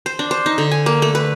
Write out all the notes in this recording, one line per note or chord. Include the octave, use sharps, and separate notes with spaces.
C5
D4
C5
D#4
D3
G#5
A#3
A3
B4